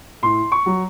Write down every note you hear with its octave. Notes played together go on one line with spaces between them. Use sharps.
A2 C6
C#6
F#3